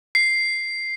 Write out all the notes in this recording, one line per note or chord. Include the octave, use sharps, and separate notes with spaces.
C7